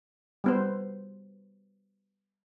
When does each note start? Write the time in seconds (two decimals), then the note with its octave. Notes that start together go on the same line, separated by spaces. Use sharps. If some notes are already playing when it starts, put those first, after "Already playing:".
0.44 G3 B3 C5